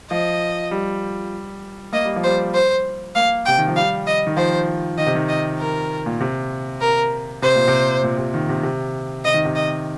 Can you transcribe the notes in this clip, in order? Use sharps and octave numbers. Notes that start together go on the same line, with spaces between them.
F3 D#5
G3
A#3 D#5
G3
F3
G3 C5
C5
A#3 F5
C3 G5
D#3
F3
G3 F5
D#5
D#3
F3 C5
D#3 D#5
C3
D#3
D#5
A#4
A#2
C3
A#4
C3 C5
A#2
C3
A#2
C3
D#3
C3
C3
C3 D#5
D#3
C3
D#5